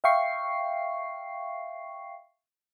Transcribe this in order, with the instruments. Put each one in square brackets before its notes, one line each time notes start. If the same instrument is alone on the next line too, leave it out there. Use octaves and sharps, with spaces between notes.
[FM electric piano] E5 F5 G5 C#6 C7